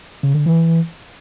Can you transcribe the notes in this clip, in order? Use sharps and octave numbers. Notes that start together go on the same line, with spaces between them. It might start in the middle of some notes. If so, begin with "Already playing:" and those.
C#3
D3
E3